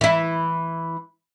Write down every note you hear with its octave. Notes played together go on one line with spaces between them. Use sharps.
E3 E4